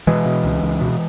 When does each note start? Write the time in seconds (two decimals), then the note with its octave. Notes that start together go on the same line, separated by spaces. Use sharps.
0.07 B2 E3 G#3
0.26 B2
0.44 C#2
0.63 C#2
0.81 B2